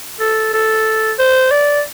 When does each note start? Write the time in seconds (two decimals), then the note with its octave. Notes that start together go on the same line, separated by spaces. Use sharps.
0.20 A4
0.53 A4
1.19 C5
1.51 D5